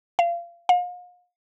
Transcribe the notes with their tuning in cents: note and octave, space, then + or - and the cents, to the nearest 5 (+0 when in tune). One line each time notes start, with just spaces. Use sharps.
F5 -25
F5 +40